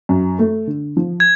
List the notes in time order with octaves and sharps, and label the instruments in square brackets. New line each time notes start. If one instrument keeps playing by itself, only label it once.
[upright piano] F#2
A3
D3
F3
[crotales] G#6